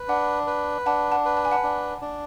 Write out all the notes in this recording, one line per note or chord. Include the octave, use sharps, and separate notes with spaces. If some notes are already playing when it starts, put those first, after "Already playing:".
Already playing: B4
D4 F#5
B4
D4 F#5 A5
F#5 A5
B4
A5
G#5
F#5 A5
D4
D4